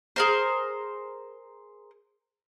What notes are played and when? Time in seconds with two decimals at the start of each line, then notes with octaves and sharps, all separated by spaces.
0.16 G#4 A#4 C5